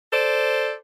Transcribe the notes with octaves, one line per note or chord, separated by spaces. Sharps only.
A4 C5 D5